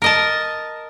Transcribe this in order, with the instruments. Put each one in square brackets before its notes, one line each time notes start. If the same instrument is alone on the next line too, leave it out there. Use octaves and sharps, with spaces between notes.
[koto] A#4 D#5 A5